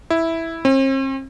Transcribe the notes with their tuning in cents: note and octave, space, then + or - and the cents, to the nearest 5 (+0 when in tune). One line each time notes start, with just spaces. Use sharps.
E4 -5
C4 +45